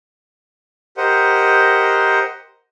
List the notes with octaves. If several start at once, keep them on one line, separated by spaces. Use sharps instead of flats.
G4 A#4 C5 D#5 F#5